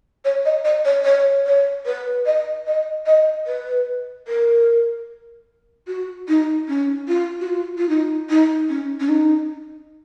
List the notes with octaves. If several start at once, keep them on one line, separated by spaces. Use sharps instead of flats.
C#5
D#5
D#5
C#5
C#5
C#5
B4
D#5
D#5
D#5
B4
A#4
F#4
D#4
C#4
F4
F#4
F4
F4
D#4
D#4
C#4
C#4
D#4